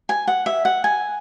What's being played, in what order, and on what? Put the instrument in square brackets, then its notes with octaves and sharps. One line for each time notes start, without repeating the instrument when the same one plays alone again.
[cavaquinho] G#5
F#5
E5
F#5
G#5